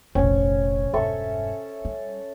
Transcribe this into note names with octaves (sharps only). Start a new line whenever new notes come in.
F1 A#1 C#4
E1 G2 A4 E5 C#6
G3